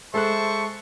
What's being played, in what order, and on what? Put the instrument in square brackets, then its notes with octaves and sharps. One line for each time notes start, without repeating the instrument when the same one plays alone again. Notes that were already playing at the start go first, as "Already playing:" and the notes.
[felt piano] G#3 A4 F#6 [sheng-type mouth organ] C5 E5 A5 [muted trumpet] C#6